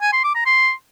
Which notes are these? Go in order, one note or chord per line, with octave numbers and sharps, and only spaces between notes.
G#5
C6
D6
A#5
C6